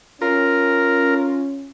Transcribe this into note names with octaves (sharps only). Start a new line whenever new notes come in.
C#4 F4 A#4